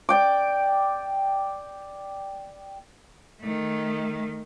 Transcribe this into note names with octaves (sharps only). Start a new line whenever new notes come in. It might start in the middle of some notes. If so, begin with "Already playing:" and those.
D5 G5 D6
D#3 A3